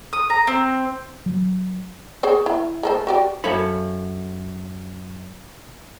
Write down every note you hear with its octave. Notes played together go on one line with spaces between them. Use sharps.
D#6
A#5
C4
F#3
G#4 C5 C#5
E4
G#3 A4 C5
F#4 G4 D5
F#2 A4 C#5 F5 B5